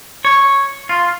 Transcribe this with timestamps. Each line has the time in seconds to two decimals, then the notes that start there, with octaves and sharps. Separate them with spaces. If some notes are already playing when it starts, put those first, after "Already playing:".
0.25 C#5
0.89 F4